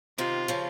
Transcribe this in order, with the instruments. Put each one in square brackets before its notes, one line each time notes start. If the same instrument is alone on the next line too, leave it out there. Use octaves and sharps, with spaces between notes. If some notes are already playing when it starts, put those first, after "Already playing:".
[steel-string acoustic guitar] C3 D#3 [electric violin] F4
[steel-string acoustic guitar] C#3 F3